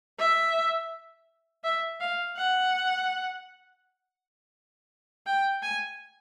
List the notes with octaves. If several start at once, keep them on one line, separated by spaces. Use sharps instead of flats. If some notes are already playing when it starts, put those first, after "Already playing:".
E5
E5
F5
F#5
G5
G#5